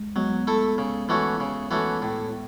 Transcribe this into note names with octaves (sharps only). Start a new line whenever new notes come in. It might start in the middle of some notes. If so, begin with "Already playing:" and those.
Already playing: G#3
F#3 G#3 B3
A3 E4 A4
C#3
E3 A3 C#4 F#4
C#3
E3 A3 C#4 F#4
A2